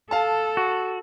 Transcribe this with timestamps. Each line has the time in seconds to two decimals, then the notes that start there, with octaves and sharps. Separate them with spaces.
0.11 A4 F5 A5
0.57 F#4